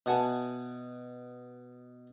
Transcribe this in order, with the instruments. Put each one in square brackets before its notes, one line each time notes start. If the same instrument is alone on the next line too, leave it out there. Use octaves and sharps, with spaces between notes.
[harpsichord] B2 F#4 G#5 [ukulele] E5 F#5 A5